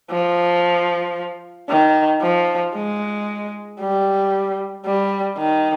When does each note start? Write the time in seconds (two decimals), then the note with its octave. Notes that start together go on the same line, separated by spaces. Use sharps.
0.11 F3
1.69 D#3
2.21 F3
2.75 G#3
3.81 G3
4.86 G3
5.38 D#3